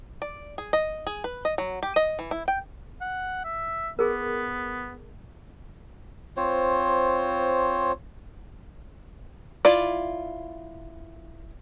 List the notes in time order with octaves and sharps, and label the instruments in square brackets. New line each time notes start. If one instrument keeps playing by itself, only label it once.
[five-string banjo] D5
G#4
D#5
G#4
B4
D#5
F#3
G4
D#5
E3
E4
G5
[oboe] F#5
E5
[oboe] B3 [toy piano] G#4 A#4
[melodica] C4 F4 C5 C#5
[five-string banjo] E4 F4 D5